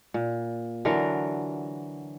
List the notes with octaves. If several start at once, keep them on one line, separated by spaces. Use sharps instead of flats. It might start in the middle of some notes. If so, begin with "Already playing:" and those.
A#2
D3 E3 F#3 A#4